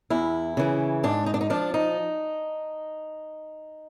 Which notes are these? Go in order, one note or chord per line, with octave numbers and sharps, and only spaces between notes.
E2 E4
C#3 E3
G#2 D4
D#4
D4
D#4
F3 D4
D#4